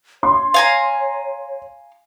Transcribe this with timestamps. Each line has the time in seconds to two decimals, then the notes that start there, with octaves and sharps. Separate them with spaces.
0.23 C#5 C6
0.54 F5 G#5 A#5